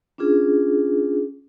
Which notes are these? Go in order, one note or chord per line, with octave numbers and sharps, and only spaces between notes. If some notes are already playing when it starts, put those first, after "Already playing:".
C#4 D4 F4 G#4